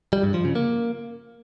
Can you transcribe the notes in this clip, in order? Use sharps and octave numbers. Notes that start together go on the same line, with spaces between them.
G3
G2
F3
C#3
A#3